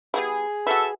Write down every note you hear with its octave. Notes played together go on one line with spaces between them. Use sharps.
G3 B3 E4 G#4
F#4 A4 B4 E5